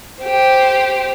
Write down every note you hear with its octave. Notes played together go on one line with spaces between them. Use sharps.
G4 C5